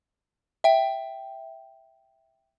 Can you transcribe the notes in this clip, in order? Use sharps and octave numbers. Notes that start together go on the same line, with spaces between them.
E5 G5